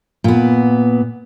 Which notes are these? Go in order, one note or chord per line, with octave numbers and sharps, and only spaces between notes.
A#2 B3